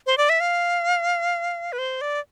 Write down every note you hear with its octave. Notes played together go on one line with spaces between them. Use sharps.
C5
D5
E5
F5
B4
C5
D5